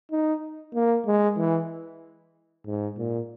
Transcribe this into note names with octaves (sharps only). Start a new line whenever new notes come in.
D#4
A#3
G#3
E3
G#2
A#2